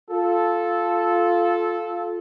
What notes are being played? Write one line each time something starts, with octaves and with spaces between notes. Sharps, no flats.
F4 A4